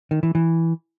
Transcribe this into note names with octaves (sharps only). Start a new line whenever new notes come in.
D#3
E3
E3